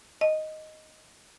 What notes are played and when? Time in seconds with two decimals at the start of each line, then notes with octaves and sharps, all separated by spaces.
0.21 D#5